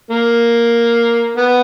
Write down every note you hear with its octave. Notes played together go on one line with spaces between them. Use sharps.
A#3
B3